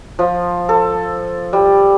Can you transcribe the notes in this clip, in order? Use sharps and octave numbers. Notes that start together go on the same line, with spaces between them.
F3
A4
G3